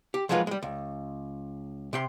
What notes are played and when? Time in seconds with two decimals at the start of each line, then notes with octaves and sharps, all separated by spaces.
0.14 G4
0.29 F3 F#3 G#3 A#3 F4 B4
0.47 G3 G#3
0.63 C#2
1.93 C3 G5 C6